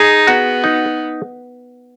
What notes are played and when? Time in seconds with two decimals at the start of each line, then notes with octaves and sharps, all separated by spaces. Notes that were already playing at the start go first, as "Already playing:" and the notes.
Already playing: D#4 G#4
0.27 B3 F#4
0.64 D#4